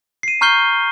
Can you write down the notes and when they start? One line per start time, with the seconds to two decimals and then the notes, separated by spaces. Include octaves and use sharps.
0.23 C7 D#7
0.41 A#5 C#6 F6 G6 C7 G7